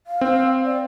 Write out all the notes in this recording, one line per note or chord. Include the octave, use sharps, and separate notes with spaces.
F5
C4
D5